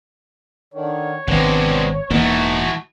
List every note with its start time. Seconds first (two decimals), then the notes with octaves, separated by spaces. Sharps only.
0.74 D3 D#3 C#5
1.28 G#1 C3 G#3 B3 C4 D4
2.11 E1 E2 E3 A3 A#3 D#4 F#4